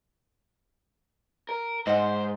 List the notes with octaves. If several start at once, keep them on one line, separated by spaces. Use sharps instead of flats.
A#4
G#2 C5 D#5 F#5